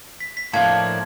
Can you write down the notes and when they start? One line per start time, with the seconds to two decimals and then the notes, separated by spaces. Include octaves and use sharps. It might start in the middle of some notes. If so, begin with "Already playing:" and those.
0.20 B6
0.37 B6
0.53 A2 F3 A#3 D4 A5 G#6